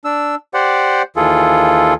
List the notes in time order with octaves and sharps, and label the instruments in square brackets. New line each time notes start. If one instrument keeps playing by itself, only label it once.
[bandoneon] D4 E6
G4 C5 D5 F#5
D#2 E3 F4 G#4 A4